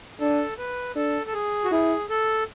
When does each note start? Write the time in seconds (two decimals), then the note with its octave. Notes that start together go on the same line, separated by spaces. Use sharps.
0.20 D4 A4
0.58 B4
0.96 D4 A4
1.27 A4
1.34 G#4
1.65 F#4
1.71 E4 G#4
2.10 A4